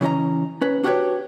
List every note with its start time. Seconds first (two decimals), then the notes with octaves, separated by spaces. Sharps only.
0.01 C#3 E3 C#4 D#5 A#5
0.61 C#4 B4
0.83 D4 F#4 G4 A#4 B4 C#5